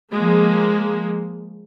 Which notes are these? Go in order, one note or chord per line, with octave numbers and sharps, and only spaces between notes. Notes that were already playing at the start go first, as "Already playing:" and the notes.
F3 G#3 A#3